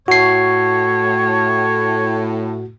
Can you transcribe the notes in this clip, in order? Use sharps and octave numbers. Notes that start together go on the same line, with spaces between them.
A2 F#4 C#5 C7